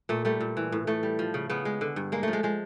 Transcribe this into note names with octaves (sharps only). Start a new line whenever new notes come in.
A#2 A3
G3 A3
A#2
E3
A2
A2 A3
G3
F3
C#3
C#3 B3
G#3
D3
G2
G#3 A#3
F3 A3
G#3
F3 G#3